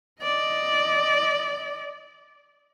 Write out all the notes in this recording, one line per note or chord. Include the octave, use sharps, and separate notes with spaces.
D5 D#5